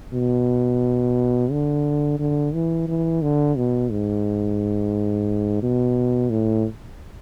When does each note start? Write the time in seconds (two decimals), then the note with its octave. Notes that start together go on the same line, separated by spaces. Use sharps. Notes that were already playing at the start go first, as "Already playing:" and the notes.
0.13 B2
1.51 D3
2.20 D3
2.54 E3
2.88 E3
3.22 D3
3.56 B2
3.91 G#2
5.63 B2
6.30 A2